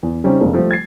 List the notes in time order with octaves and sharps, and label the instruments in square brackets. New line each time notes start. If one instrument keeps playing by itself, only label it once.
[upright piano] E2
C#3 G3 C4 C#4 D#4
F1 G#3 A#3 D4
F3 G3 A3
G#6 A6 C7